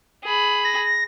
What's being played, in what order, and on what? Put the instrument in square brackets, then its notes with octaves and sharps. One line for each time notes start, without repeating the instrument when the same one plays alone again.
[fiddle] G#4 B5
[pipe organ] A#6